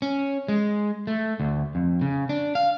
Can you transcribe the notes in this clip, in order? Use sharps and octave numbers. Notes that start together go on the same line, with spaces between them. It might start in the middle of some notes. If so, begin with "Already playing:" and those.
C#4
G#3
A3
D2
F2
C#3
D4
F5